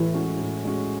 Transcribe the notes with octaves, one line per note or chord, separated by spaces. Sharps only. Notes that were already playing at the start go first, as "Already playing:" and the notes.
Already playing: A2 E3
G#3 C#4 F#4
A2
G#3 C#4 F#4